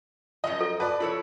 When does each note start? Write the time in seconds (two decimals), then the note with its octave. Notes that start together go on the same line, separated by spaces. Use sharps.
0.44 F#2 F3 D#5
0.61 A4
0.80 B4 D5 A5
1.00 F3 E4 A4 C#5